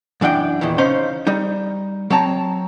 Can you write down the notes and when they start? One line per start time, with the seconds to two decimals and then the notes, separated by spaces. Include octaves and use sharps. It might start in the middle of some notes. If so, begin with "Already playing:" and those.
0.21 F#2 E3 D4 F#5 G5
0.61 E2 A#2 D#3 E3
0.78 C#3 C#4 D#4 C5 C6
1.27 G3 D#4
2.10 F#3 C4 C#5 A5 A#5